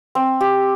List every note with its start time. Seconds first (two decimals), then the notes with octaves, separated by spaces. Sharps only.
0.15 C4
0.41 G4